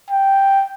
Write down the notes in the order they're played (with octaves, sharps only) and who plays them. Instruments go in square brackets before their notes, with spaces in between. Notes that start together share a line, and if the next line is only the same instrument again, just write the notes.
[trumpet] G5